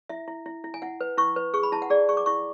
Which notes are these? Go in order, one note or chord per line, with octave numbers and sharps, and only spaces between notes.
E4 E5
E4
E4
E4
G#5
E4 F#5
B4
E4 C#6
B4
G#4 C#6
B5
E4 A5
F#5
G#4 D5
G#4 C#6
D6
E4 C#6